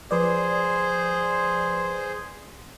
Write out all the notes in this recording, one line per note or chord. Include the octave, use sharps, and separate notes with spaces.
F3 G#4 B4 C5 D5